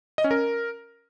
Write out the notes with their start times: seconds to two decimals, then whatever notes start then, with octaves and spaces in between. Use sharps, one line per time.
0.18 D#5
0.24 C#4
0.31 A#4